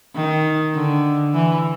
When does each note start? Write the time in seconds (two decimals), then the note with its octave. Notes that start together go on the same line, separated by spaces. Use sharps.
0.15 D#3
0.74 D3
1.33 E3